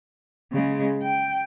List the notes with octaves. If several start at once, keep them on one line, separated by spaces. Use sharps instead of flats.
C#3 G#3
G5